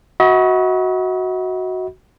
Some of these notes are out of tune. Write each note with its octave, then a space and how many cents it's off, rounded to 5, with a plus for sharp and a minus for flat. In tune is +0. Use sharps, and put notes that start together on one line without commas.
F#4 +0 D#5 +45 B5 -15